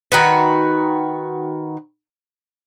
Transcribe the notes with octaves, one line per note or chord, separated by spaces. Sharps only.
D#3 F#4 B4